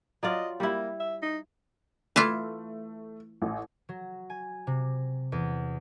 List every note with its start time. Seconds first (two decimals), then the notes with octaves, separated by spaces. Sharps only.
0.23 F#3 F4 D5 D#5
0.60 G3 A#3 E4
1.00 E5
1.22 D#4
2.16 E3 A3 E4 F4
3.42 A1
3.89 F#3
4.30 G#5
4.67 C3
5.32 E2